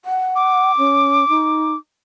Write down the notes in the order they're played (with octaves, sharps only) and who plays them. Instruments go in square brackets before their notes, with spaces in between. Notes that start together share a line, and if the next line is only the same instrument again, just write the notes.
[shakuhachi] F#5
[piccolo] D6
[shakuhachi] C#4
D#4